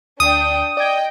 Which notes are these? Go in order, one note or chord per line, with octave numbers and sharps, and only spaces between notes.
D2 D4 G5 D#6
D5 D#5 G5 G#6